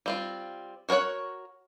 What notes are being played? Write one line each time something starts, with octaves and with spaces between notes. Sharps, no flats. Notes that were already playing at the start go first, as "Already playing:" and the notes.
G3 C4 F4
F#4 A#4 C5 C#5 F#5